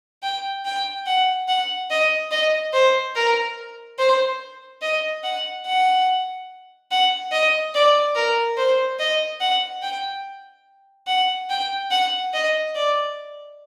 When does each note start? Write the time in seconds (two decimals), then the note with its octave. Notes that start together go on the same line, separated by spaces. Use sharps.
0.23 G5
0.65 G5
1.06 F#5
1.48 F#5
1.90 D#5
2.31 D#5
2.73 C5
3.16 A#4
3.99 C5
4.82 D#5
5.24 F#5
5.66 F#5
6.91 F#5
7.32 D#5
7.75 D5
8.15 A#4
8.57 C5
8.99 D#5
9.41 F#5
9.83 G5
11.07 F#5
11.50 G5
11.91 F#5
12.33 D#5
12.75 D5